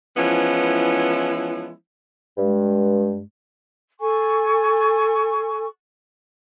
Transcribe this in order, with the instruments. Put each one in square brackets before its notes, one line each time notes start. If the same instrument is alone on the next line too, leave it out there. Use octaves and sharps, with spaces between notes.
[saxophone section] E3 F3 G#3 B3 C#4 E4
[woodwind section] G2 G#3
[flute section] A4 G#5 C#6